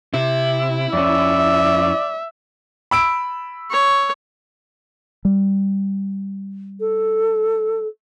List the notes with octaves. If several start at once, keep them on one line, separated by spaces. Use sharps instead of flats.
C3 E4
F2 C#4 D5 E5
B5 E6 D7
C#5
G3
A4